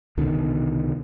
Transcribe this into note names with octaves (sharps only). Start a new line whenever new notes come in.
C2 B2 D3 D#3